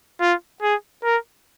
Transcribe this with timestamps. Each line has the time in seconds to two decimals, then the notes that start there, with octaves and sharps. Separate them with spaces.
0.21 F4
0.62 G#4
1.04 A#4